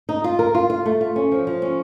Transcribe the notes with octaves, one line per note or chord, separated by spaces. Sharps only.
D#4
F4
A#4
F4
F4
A3
F4
C#4
F3
F3
C#4